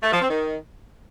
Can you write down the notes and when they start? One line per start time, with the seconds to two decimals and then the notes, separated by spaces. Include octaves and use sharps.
0.03 A3
0.12 F3
0.21 C4
0.29 D#3